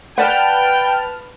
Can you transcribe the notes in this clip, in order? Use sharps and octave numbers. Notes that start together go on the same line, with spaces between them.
B4 D5 F#5 G5 A5 F6